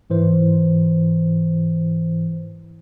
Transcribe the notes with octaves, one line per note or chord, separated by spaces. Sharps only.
G#2 E3 C5